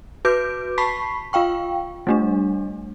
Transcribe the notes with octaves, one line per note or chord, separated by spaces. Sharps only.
F#4 B4 D6 G6 D7
A5 B5 C#6 B6 C7
F4 F5 G5 C#6
G3 A3 D4